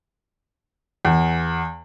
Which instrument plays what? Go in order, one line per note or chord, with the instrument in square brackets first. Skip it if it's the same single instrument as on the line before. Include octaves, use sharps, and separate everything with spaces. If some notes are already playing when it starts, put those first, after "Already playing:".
[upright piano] E2